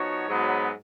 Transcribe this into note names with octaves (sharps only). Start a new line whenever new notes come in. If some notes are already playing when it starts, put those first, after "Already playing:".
Already playing: F3 B3 D#4 F#4 C#5
G#2 F#3 B3